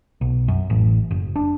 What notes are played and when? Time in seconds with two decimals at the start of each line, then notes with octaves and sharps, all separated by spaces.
0.21 B1
0.48 F#2
0.70 A1
1.11 F#1
1.36 D4